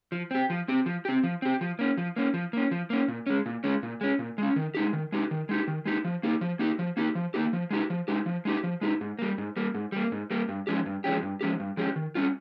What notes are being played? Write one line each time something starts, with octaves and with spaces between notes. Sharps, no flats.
F3
C4 G4
F3
C4 G4
F3
C4 G4
F3
C4 G4
F3
A#3 C#4
F3
A#3 C#4
F3
A#3 C#4
F3
A#3 C#4
A#2
G#3 C#4
A#2
G#3 C#4
A#2
G#3 C#4
A#2
G#3 C#4
D#3
G#3 D#4 G4
D#3
G#3 D#4 G4
D#3
G#3 D#4 G4
D#3
G#3 D#4 G4
F3
A#3 D#4 G4
F3
A#3 D#4 G4
F3
A#3 D#4 G4
F3
A#3 D#4 G4
F3
G#3 D#4 G4
F3
G#3 D#4 G4
F3
G#3 D#4 G4
F3
G#3 D#4 G4
G#2
G3 A#3
G#2
G3 A#3
G#2
G3 A#3
G#2
G3 A#3
G2
F3 G#3 C#4 G4
G2
F3 G#3 C#4 G4
G2
F3 G#3 C#4 G4
G2
F3 G#3 C#4 G4
D#3
G3 C#4 F4